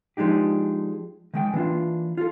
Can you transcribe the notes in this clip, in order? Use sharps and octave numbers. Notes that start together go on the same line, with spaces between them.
F3 G#3 D4 D#4 G4
D#3 G#3 G5
E3 A#3 D4 F4
F4 A4